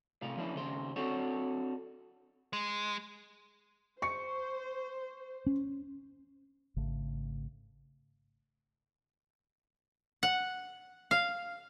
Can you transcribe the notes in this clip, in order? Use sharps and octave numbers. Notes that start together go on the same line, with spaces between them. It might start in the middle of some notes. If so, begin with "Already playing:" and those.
A2 C3 F5
F3 A#3 C#4 D4 E4
D#2 C#3 C5
C4 D4 F#4 A4 C#5
G#3
C5 C#6 C#7
C#4
G#1 C#3 A3
F#5
F5